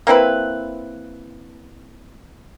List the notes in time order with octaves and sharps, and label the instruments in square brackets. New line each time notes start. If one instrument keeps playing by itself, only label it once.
[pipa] A#3 C4 E4 B4